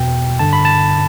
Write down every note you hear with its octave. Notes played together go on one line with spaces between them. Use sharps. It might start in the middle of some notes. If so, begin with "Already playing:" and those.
Already playing: E2 B2 G5
G2 D3 A5
B5
A5